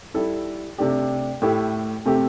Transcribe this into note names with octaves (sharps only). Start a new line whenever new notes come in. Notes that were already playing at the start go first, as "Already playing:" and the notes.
G3 E4 A4
C3 A3 D4 G4
A2 A3 E4 G4
C3 A3 C4 G4